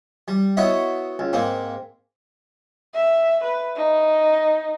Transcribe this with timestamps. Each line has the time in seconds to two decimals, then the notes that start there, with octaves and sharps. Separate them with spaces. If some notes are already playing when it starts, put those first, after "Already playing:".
0.28 G3
0.57 B3 E4 F#4 C#5 D#5 E5
1.19 C#2
1.33 G#2 A#3 C4
2.95 E5
3.44 B4
3.76 D#4